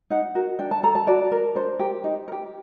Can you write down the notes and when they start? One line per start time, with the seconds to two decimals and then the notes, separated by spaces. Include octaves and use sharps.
0.10 D#4 F#5
0.35 F#4 A#4
0.59 D4 G5
0.71 A5
0.83 A4 A#5
0.95 A5
1.07 F#4 D5
1.32 A#4
1.55 D4 C5
1.79 G4 A#4
2.04 D#4
2.28 A#4
2.32 G4